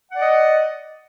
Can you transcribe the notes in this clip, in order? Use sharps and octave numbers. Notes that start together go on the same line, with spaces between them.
D5 D#5 F#5